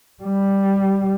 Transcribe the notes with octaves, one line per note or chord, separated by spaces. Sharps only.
G3